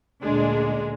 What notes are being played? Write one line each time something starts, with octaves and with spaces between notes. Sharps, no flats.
D2 A#2 G#3 D4